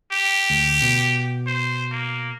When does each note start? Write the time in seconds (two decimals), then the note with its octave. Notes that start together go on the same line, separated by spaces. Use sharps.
0.12 G4
0.50 D2
0.82 B2
1.47 C5
1.92 A#3